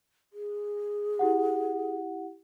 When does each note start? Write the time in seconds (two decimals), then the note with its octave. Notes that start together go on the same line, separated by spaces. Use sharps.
0.33 G#4
1.19 E4 G4 F#5